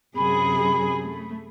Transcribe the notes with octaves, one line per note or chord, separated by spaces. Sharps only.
F#2 C3 G#4 B5
A3